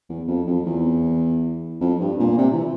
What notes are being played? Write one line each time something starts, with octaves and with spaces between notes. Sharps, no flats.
E2
F2
F2
E2
F2
G2
A#2
C3
E3